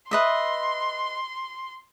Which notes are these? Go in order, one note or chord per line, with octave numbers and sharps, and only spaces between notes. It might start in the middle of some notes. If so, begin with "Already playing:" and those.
B4 D#5 E5 C6